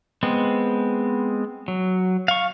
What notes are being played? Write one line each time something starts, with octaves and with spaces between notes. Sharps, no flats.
G#3 B3 C4
F#3
F5 C#6